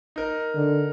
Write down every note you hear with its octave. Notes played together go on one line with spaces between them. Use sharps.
D#4 A#4
D3